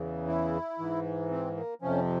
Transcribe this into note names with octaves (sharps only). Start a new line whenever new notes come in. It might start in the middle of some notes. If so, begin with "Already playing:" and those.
Already playing: E2 C#3 E3
E4
G#2 E3
C4
A#3
F2 C3 F3 C#4